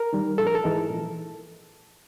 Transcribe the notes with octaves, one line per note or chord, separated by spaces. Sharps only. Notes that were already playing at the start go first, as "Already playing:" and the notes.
Already playing: A#4
D#3 G3
A#1 A4
A#4
A4
G#2 E3 G#3
A#1